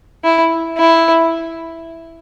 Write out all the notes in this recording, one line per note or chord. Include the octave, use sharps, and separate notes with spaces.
E4
E4